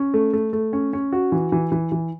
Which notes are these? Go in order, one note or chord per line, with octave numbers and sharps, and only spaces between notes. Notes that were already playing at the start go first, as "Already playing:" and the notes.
Already playing: C#4
A3
A3
A3
C#4
C#4
F#4
E3
E3
E3
E3